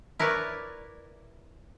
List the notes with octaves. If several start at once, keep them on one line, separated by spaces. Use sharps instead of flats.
E4 A#4 B4 C#5 D5